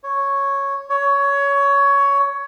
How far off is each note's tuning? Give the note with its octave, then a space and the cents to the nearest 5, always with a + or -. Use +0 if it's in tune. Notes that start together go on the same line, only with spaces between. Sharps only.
C#5 -5
C#5 +15